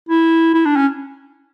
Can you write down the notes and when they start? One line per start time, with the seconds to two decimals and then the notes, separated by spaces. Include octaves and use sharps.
0.09 E4
0.54 E4
0.65 D4
0.76 C#4